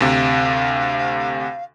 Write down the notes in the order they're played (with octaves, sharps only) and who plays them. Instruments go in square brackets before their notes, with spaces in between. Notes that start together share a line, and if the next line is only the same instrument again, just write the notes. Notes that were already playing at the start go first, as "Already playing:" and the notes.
[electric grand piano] D2 C3 [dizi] F5